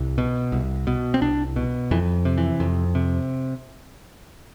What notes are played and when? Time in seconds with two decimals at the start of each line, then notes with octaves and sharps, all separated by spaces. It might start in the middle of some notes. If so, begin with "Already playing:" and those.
Already playing: C2
0.18 B2
0.52 C2
0.87 B2
1.14 C4
1.21 C2 D4
1.56 B2
1.91 F2 E3
2.25 C3
2.38 E3
2.60 F2
2.95 C3